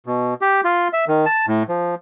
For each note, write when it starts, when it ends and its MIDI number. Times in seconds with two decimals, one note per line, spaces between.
0.06 0.34 47
0.41 0.61 67
0.64 0.88 65
0.93 1.05 76
1.08 1.25 51
1.26 1.46 81
1.47 1.63 45
1.69 1.95 53